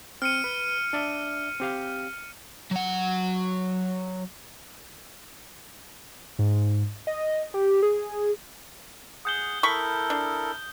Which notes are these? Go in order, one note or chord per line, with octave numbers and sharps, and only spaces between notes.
C4 F6 C#7 D#7
B4
D4 D5 E5
C4 G4 F5
F#3 F#5
G#2
D#5
G4
G#4
G#4 F#5 D#6 G6 G7
E4 A4 A#4 B5 C#6
D4